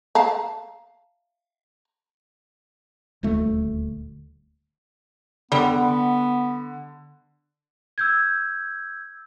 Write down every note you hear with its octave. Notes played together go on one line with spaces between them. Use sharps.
F5 A5 A#5
D#1 D2 A3
D3 G3 B3
E6 G6 G#6